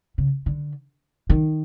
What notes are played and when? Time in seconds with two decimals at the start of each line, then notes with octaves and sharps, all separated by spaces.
0.18 C#3
0.46 D3
1.29 D#3